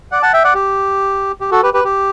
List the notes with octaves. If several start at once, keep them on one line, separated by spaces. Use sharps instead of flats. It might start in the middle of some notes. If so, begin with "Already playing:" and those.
D5 F#5
F#5 A5
E5 G5
D5 F#5
G4
G4
F#4 A4
G4 B4
G4 B4
G4